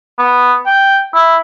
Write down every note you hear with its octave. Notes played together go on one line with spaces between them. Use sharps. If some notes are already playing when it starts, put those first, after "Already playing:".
B3
G5
E4